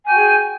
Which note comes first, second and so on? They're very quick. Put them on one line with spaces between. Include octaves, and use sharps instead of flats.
G#5 G5 F#4 G#4